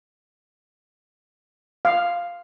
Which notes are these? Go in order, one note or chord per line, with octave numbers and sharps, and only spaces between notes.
F5